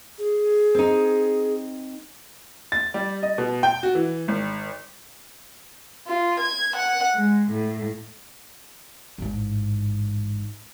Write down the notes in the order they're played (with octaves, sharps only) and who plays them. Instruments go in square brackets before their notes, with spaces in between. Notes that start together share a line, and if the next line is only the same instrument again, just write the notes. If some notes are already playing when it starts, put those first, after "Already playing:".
[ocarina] G#4
[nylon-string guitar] C4 D#4
[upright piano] A6
G3
D#5
B2
G5
F#4
E3
G#1
[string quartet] F4
G#6
F#5
G#3
A2
[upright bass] A1 G#2